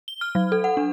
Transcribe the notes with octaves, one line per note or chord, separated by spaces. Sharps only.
G7
F6
F#3
A4
F#5
D4